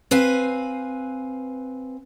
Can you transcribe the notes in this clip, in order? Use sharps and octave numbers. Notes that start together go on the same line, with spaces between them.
C4 B4 F5 G#5